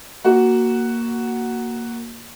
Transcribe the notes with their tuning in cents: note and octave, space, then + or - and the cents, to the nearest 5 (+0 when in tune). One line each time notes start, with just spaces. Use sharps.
A#3 +0 F#4 +5